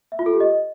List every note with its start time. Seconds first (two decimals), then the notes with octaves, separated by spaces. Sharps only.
0.12 E5
0.19 F4
0.26 A4
0.33 G4
0.40 D#5